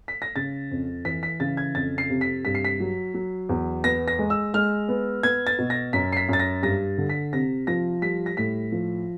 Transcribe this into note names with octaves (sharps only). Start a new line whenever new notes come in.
B6
A#6
C#3 A6
F2
E3 B6
B6
C#3 A6
G#6
F2 A6
C7
C3
B6
G2 B6
C7
B6
F#3
F#3
E2
B3 A#6
A#6
G#3
E6
G#3 F6
B3
B3 G#6
A6
B2
A#6
F#2 B6
C7
B6
F#2 A6
A#6
G2 A#6
D3
B6
C3 A#6
F3 A#6
G3 B6
A#6
A2 B6
F3